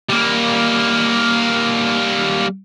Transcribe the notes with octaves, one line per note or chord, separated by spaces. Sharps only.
G3 A#3